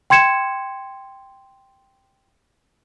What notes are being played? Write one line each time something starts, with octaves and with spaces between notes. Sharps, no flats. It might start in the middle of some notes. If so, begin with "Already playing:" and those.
G5 C6 G#6 C#7 E7